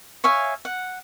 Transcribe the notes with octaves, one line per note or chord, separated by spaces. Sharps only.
C#5 E5 F5 G#5
F#5